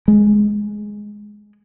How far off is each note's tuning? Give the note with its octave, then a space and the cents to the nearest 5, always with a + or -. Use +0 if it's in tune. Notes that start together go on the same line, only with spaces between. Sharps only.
G#3 +5